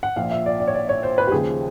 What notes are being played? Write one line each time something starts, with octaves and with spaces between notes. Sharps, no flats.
F#5
A#1 A#2 F3 F5
E5
D5
D5
C#5
D5
C#5
C5
B4
G4
D#2 C#3 F3 G#4